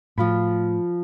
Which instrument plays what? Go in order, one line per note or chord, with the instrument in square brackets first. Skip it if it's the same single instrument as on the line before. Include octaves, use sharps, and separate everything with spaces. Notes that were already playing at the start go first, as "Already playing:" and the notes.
[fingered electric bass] A2 [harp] F3 F4 B5